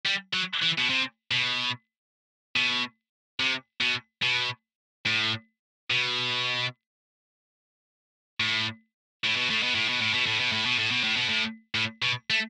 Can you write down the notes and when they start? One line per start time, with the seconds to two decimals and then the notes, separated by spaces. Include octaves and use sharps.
0.05 G3
0.33 F#3
0.62 E3
0.78 B2
0.89 C3
1.31 B2
2.56 B2
3.40 C3
3.81 B2
4.23 B2
5.06 A2
5.90 B2
8.40 A2
9.24 A2
9.37 B2
9.50 A2
9.63 B2
9.75 A2
9.89 B2
10.01 A2
10.14 B2
10.26 A2
10.40 B2
10.52 A2
10.65 B2
10.79 A2
10.91 B2
11.04 A2
11.17 B2
11.29 A2
11.75 A2
12.02 B2
12.30 A3